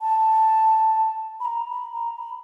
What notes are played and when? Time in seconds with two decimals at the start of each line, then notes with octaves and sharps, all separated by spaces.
0.01 A5
1.40 B5
1.45 A#5
1.69 B5
1.93 A#5
2.17 B5